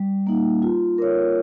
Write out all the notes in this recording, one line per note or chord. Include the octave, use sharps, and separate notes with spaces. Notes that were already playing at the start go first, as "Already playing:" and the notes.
Already playing: G3
A#3 D#4
F4
A#4 C#5